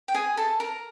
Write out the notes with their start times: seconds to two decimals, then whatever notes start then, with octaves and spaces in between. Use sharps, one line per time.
0.08 G5
0.14 G#4 G#5
0.37 A4 A5
0.60 A#4 A#5